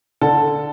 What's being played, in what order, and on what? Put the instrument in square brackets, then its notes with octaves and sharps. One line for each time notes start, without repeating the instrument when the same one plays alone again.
[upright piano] D3 A4